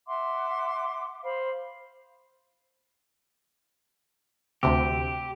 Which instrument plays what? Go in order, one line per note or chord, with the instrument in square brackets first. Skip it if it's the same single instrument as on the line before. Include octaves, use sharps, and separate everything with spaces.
[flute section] E5 F#5 C6 D6
C5 F5 B5
[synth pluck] D2 C3 [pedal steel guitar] G4